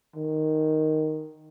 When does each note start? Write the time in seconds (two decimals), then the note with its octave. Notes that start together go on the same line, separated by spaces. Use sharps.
0.16 D#3